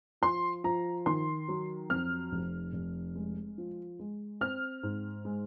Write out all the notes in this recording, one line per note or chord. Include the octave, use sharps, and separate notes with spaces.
F3 C6
F3 A#5
D#3 C6
F#3
F2 F6
F1
F1
G#3
F3
G#3
C4 F6
G#2
G#3